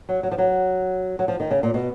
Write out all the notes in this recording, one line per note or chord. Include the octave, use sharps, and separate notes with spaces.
F#3
F#3
F3
F#3
F#3
F3
D#3
C#3
A#2
B2